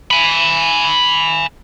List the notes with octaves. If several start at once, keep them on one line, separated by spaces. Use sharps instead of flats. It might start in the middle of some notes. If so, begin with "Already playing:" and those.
G#5 B5